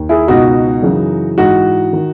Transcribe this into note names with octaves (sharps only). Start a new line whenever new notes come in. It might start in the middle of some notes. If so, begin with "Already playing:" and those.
Already playing: D#2 D#3
E4 G#4
C#2 B2 D#4 F#4
F#2 C#3 E3
G#2 E3 D#4 F#4
D#3